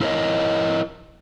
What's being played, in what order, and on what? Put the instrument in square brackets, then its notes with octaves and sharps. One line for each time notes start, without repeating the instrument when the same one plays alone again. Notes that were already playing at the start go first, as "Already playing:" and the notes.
[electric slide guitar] E4 F4 A#4 C5 C#5 D#5